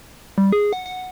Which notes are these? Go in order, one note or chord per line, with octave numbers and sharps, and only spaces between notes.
G3
G#4
F#5
F#5